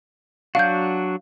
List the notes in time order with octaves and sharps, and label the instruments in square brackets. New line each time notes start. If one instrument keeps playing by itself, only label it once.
[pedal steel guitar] F#3 D4 F#4 [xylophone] F5 G6